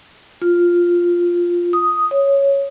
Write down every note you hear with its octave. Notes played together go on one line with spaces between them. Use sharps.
F4
D#6
C#5